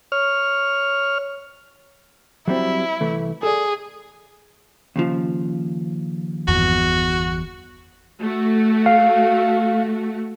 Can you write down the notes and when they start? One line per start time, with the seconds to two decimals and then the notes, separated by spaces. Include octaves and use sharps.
0.12 C#5 F6
2.48 F#3 G3 C4 E4
3.01 C2 E3 A3
3.43 G#4 A4 D5
4.96 D#2 C#3 F3
6.48 G1 E2 F#4
8.20 A3 F#4
8.86 F5